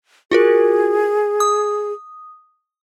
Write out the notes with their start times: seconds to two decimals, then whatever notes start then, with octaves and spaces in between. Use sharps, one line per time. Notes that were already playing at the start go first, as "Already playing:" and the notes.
0.31 F4 F#4 G#4 A#4
1.40 D#6